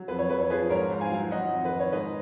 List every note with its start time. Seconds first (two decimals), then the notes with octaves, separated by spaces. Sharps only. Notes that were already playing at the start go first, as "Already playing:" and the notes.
Already playing: F#3
0.08 F2 B4
0.19 C#5
0.29 F2 B4
0.40 C#5
0.50 F3 G#4 B4
0.70 G#2 A#4 C#5
0.90 G#2
1.00 F5 G#5
1.11 F#3
1.31 D#3 D#5 F#5
1.52 F2
1.65 B4
1.73 D#3
1.79 C#5
1.92 G#2 B4 D#5